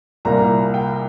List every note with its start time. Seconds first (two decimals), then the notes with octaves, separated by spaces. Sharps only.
0.25 C2 A#2 G3 A#3 A#5
0.74 G5